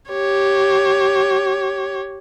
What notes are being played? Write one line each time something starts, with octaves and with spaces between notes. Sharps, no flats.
G4 C#5